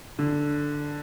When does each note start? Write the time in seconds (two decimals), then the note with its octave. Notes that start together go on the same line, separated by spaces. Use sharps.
0.19 D3